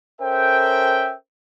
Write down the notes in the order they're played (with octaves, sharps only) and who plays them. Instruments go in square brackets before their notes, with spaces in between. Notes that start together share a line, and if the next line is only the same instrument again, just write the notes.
[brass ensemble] C#4 A4 A#4 C5 E5 G5